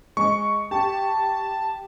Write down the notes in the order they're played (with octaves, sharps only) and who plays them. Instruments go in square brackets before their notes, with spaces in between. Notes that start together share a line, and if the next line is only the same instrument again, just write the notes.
[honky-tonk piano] G#3 [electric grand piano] C#6
[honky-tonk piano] G4 [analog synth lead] A5